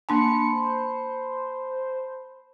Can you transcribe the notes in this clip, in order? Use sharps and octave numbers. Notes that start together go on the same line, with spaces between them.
A#3 D4 G#5 A5 B5 C6 C#7
C5